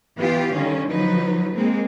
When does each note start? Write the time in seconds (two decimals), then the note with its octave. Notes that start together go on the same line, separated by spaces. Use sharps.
0.18 E3 B3 F4 G4 F5
0.53 D3 D#3 G3 C#4
0.89 F3 F#3 D#4 B4
1.55 G#3 A#3 C4